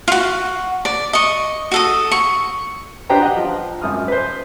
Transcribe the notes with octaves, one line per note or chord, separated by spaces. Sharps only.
F4 F#4
D5
D#5 C#6
F#4 A4 D#6
C#6
D4 G4 B4 C5 G5 A#5
D#5 F#5
F3
G#1 F#2 D#6 F6
B4 C5